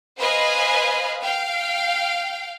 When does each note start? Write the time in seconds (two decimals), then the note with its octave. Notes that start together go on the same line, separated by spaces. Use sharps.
0.18 B4 C5 D#5 F5 G#5 B5
1.21 F5 G5